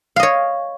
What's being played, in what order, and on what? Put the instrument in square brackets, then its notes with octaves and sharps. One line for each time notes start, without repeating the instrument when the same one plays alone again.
[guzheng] F5
D#5
C#5